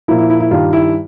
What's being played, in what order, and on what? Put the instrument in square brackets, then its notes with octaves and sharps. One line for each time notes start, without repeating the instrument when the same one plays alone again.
[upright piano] A#2 F3 A#3 E4
E4
E4
E4
G2 D#3 G3 F4
E4